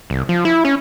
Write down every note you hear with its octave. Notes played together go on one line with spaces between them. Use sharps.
C2
F3
E4
C#4